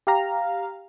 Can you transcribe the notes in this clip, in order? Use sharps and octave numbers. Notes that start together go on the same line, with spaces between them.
G4 F5 A#5 F6